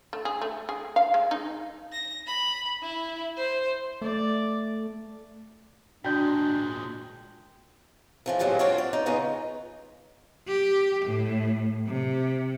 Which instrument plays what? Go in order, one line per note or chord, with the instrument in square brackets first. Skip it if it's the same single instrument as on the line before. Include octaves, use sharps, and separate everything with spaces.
[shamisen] A3
G#4
A3
G#4
F5
G#3
D#4
[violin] A#6
B5
E4
C5
[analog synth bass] A3 [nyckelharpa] D5
[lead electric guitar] A#2 G#3 [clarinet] D4 [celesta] F#4 D5 [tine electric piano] G5 G6
[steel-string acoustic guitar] E3 F3 G#3
A2 C3 F3 F#3 G#3 B3
C4 D4 F4 F#4 C#5
D5
D#4
C#3 B3 C#4 D#4 F4
[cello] G4
A2
C3